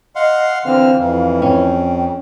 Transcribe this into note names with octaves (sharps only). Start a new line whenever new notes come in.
D#5 F5 F#5 C6
D3 E3 C4 F5 F6
F2 E3
C#4 G5